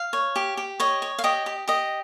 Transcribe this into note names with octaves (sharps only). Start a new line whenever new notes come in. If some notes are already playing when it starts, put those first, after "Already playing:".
Already playing: F5
C#5
G4
G4
C#5 D#5
C#5
F5
G4 D#5
G4
G4 D#5